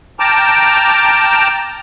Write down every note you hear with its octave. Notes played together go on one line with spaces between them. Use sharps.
G5 A5 A#5 D6 F6